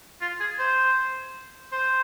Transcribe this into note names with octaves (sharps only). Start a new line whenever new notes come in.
F4
G#4
C5
C5